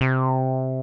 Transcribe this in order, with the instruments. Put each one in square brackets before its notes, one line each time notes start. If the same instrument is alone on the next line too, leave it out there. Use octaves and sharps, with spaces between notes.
[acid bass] C3